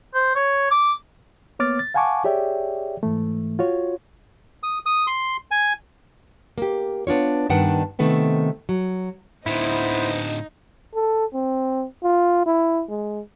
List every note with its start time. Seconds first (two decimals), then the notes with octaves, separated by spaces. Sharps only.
0.14 C5
0.35 C#5
0.71 D6
1.59 A#3 B3 C#5 D6 F6 A6
1.79 A6
1.94 F5 F#5 G#5 A5 C#6 D6
2.24 G4 G#4 C#5 D5 E5 G5
3.03 G#2 E3 A3
3.59 F4 F#4 C#5
4.63 D#6
4.86 D#6
5.07 C6
5.51 G#5
6.58 A#3 G4
7.07 B3 D4 F4 C#5
7.50 G2 D#3 B3 D4 F#5 G5
7.99 C3 D#3 A3 B3 C4
8.69 F#3
9.46 A2 D3 B3 D#4 E4 C5
10.94 A4
11.34 C4
12.03 F4
12.46 E4
12.89 G#3